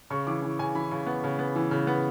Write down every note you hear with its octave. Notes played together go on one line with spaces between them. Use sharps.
C#3 C#6
E3 D6
E3
C#3 G#5
E3 B5
C#3
B3
C#3
B3
E3
C#3
B3